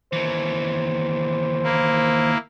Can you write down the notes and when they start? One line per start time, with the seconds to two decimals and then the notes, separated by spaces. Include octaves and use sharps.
0.13 D#2 E3 C5
1.63 A#3 E4